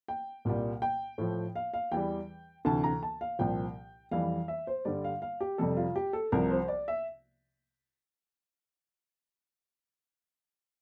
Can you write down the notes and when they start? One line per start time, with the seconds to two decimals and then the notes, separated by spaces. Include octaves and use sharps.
0.08 G5
0.45 C2 A#2 G3
0.82 G5
1.18 A2 F3
1.56 F5
1.74 F5
1.92 E2 E3 G3 G5
2.65 D2 C3 E3 A5
2.84 A#5
3.03 A5
3.21 F5
3.39 C2 A#2 F3 G5
4.11 F2 E3 G3 F5
4.48 E5
4.67 C5
4.85 G2 D3 G3 D5
5.04 F5
5.22 F5
5.41 G4
5.58 F2 C3 G3 A4
5.77 F4
5.96 G4
6.13 A4
6.32 C2 C3 F3 A#4
6.50 C5
6.68 D5
6.88 E5